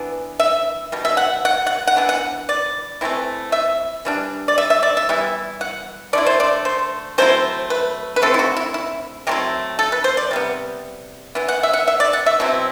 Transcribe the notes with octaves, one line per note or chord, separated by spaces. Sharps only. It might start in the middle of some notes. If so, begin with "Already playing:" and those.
Already playing: E3 B3 D4
E5
B2 G3
E5
F#5
F#5
F#5
F#5
E3 B3 D4
F#5
D5
E3 A3 C4 E4
E5
E3 G3 D4
D5
E5
E5
D5
E5
E3 G3 B3 E4
F#5
D3 A3 E4 D5
C5
D5
C5
F#3 A3 C4 E4 C5
B4
B4
D3 A3 C4 E4 A4
E4
F#4
E4
E4
F#3 A3 C4 E4 G4
A4
B4
C5
D5
C3 G3 B3
E3 B3 E4
F#5
E5
F#5
E5
D5
F#5
E5
B2 F#3 C4 E4